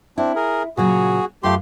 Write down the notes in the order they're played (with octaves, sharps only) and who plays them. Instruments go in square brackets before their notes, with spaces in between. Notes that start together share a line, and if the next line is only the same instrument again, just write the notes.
[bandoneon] C4 D4 [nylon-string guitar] E4
[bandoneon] G#4 A#4
[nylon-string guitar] A#2 C#3 F#3 [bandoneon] F#4 G#4
[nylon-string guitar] F#2 F4 F5 [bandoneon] A3 G4 C6